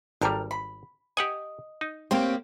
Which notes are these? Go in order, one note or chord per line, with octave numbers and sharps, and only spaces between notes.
G#1 G3 C4 A4 A#4
B5
G4 D#5 F#5 G#5
D#4
A#3 C4 G4 C5 C#5